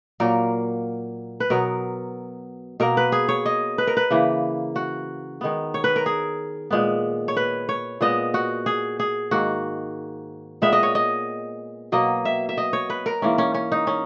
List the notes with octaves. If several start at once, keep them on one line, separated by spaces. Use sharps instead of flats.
A#2 F#3 A#3 A#4
B4
B2 F#3 B3 A#4
B2 A#3 A#4
B4
G#4
C#5
D#5
B4
A#4
B4
C#3 E3 A#3
F#4
D#3 G#3 B3
C#5
B4
A#4
G#4
A#2 G#3 B3
C#5
B4
C#5
A#2 G#3 B3 D#5
F#4
G#4
G#4
G#2 D#3 A#3 F#4
A#2 G#3 B3 E5
D#5
C#5
D#5
B2 F#3 A#3 D#5
E5
E5
D#5
C#5
B4
A#4
G#2 E3 A#3 C#4
C#4
C#4
D#4
C#4